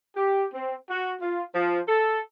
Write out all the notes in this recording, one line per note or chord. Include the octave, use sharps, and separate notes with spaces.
G4
C4
F#4
F4
F3
A4